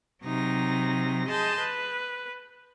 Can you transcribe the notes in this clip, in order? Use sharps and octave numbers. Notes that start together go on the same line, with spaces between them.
C3 F#3 D#4 A#6
G#4 D#5 A5 C6 G6
B4